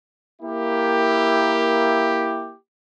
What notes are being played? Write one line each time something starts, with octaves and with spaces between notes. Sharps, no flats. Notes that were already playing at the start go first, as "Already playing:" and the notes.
A#3 E4 G4